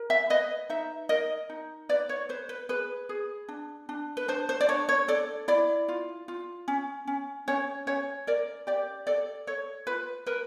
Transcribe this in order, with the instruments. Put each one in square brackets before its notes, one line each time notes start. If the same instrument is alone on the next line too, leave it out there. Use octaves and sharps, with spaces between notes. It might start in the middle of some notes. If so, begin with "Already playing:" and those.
Already playing: [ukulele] A#4
E5
B4 D#5
D#4 E5
A#4 D#5
D#4
B4 D5
C#5
B4 C5
B4
G#4 B4
G#4
D4
D4
B4
D4 C5
C5
D5
D4 C#5
C#5
A4 D5
E4 D5
F4
F4
C#4
C#4
C#4 C#5
C#4 C#5
A#4 D5
G4 D5
A4 D5
A4 C#5
F4 B4
A#4 B4